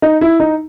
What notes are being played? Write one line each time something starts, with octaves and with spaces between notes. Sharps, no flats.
D#4
E4
D#4